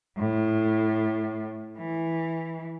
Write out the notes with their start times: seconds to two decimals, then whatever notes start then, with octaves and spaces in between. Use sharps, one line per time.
0.17 A2
1.77 E3